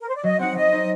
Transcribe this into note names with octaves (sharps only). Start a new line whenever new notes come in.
A#4
C5
D5
F#3 D#5
C4 D#4 F#5
F#3 D#5
C4 D#4